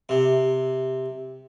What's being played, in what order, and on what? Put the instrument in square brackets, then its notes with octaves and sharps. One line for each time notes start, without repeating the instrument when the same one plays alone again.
[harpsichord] C3